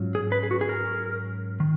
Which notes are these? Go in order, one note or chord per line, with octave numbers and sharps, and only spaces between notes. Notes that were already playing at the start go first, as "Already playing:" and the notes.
Already playing: G#2 F#3 C#4 F4
G#4
B4
G#4
F#4
G#4
A#4
D#3